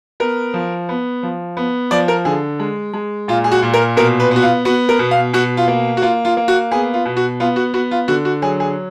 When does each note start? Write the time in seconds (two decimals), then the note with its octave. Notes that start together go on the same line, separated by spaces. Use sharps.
0.20 B3 A#4
0.54 F3
0.89 B3
1.23 F3
1.57 B3
1.91 F3 D5
2.08 A#4
2.25 D3 G#4
2.60 G#3
2.93 G#3
3.28 A#2 F4
3.44 G#4
3.52 F#4
3.62 A#2
3.74 A#4
3.97 B2 A#4
4.20 B4
4.31 B3
4.36 F#4
4.42 F4
4.65 B3 F#4
4.89 A#4
4.99 B2
5.11 F5
5.33 B2 F#4
5.57 F4
5.68 A#3
5.97 F#4
6.02 A#3 F4
6.25 F4
6.37 A#3
6.48 F#4
6.71 B3 G#4
6.94 F4
7.05 B2
7.17 F#4
7.40 B3 F4
7.56 F#4
7.74 B3 F#4
7.91 F4
8.08 D3 F#4
8.25 F#4
8.42 F#3 G#4
8.60 G#4